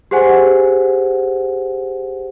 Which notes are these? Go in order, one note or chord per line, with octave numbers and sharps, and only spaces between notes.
G4 G#4 C5 F#5 G#5